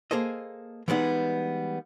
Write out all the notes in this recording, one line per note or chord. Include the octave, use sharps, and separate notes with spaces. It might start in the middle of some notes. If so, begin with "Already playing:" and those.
A#3 G#4 A4 C5 D#5
E3 G3 G#3 B3 D#4